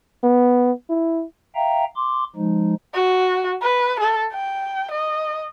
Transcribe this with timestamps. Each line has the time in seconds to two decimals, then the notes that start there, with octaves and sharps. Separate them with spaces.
0.24 B3
0.90 E4
1.55 E5 F5 G5 A#5
1.96 C6 D6
2.36 F3 G#3 D#4
2.94 F#4
3.62 B4
4.00 A4
4.32 G5
4.91 D#5